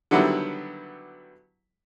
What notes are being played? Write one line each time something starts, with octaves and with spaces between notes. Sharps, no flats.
D3 D#3 F#3 G3 B3 E4